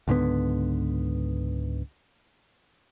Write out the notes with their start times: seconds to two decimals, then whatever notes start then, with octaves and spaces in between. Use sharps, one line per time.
0.08 C#2 G#2 D3 B3